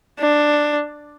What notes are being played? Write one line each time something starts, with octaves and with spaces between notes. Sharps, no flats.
D4